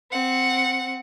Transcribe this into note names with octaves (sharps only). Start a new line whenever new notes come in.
C4 F#5